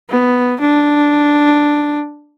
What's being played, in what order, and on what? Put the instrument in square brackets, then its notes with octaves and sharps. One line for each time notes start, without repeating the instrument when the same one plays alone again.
[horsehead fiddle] B3
D4